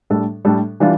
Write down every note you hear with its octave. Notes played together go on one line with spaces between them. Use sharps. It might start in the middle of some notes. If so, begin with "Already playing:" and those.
A2 G3 D4 A4
A2 G3 D4 A4
E3 G3 D4 F4